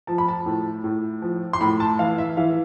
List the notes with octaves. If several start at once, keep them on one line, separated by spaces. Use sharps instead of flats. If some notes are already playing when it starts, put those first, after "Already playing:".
F3 A5
B5
A5
A2
A2
F3
C6
A2 B5
A5
E3 F5
E5
E3 F5